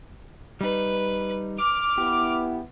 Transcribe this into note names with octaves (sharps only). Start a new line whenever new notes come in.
G3 D#4 B4
D6 F6
B3 E4 G4